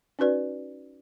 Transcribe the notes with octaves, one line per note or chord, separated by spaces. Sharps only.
C#4 D#4 F#4 B4 D5